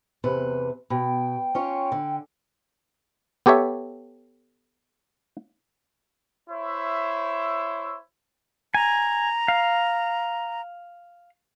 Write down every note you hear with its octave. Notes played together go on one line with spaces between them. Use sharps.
E2 C3 B4
B2 G5
C#4 F4 C#5
D3
B3 G4 A4 C#5 E5
E4 C5 C#5 E5
G#5 A#5
F5